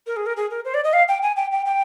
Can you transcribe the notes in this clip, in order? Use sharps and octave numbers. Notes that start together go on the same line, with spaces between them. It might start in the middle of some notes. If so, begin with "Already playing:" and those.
A#4
G#4
A#4
G#4
A#4
C5
D5
D#5
F5
G5
G#5
G5
G5
G5